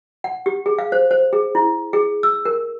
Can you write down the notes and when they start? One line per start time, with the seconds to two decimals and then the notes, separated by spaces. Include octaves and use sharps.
0.24 F#5
0.46 G4
0.66 G#4
0.79 F5
0.92 C5
1.11 C5
1.33 G#4
1.55 E4
1.93 G#4
2.23 E6
2.45 A#4